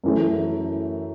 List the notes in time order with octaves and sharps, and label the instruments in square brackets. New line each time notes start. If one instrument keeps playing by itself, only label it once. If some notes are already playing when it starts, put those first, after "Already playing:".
[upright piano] F#2 E3 A3